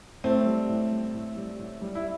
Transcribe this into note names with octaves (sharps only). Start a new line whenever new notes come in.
A2 A3 C4
G3
A2
G3
A2
G3
A2
G3
E4